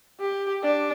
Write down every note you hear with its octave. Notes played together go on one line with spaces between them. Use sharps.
G4
D4